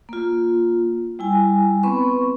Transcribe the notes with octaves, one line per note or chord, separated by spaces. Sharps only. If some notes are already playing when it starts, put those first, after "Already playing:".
A#3 F4
G3 E4 G#5
B3 C4 B4 B5 C#6